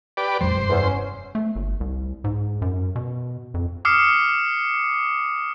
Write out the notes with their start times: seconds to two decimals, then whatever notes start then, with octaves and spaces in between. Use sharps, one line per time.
0.17 G4 B4 D5
0.41 F2 F#3 G#3 C5
0.55 F1 G2
0.69 E2
0.81 C#4
1.35 A3
1.56 G1
1.80 C2
2.24 G#2
2.62 F#2
2.96 B2
3.54 F2
3.85 D6 D#6 F6 C7 C#7